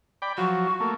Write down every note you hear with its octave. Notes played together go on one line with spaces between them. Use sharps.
D5 G5 B5
F3 F#3 F#4
A3 A#3